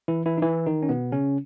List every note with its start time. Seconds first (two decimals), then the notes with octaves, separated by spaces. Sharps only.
0.08 E3 E4
0.26 E3 E4
0.38 D#4
0.42 E3 E4
0.66 D#3 D#4
0.83 C#4
0.89 B2 B3
1.12 C#3 C#4